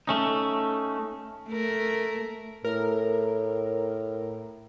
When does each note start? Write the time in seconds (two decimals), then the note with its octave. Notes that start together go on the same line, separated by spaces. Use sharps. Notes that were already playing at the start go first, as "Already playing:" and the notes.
0.07 A3 C#4 D#4
1.48 A3 A#4
2.65 A2 A#4